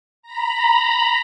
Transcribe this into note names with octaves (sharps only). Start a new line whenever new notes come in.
A#5 B5